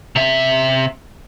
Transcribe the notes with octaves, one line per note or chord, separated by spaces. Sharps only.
C3 E5